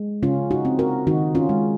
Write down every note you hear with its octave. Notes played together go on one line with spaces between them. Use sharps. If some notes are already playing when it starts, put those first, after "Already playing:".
Already playing: G#3
C#3 C#4 F4
D#4 F#4
C4
F#4 A#4
D#3 D#4 F#4
C#4 F4
G#3